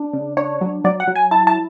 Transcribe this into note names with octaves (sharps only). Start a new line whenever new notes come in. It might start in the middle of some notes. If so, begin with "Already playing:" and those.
Already playing: D4
C#3
D4 C#5
F#3
F#3 D5
F#5
F#3
G#5
E4 A5
A5